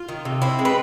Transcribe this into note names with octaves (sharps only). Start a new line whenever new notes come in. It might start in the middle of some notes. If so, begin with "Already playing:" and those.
Already playing: F4
D#3
C3
C4 E4
G#3
B4